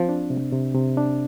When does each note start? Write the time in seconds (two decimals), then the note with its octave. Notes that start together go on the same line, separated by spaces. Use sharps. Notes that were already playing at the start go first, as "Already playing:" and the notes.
Already playing: F3 C4
0.09 D4
0.30 C3
0.52 C3
0.75 C3
0.97 D4